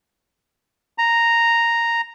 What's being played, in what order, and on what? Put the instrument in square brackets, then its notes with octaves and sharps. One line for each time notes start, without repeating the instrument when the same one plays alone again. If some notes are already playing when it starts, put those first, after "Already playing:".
[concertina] A#5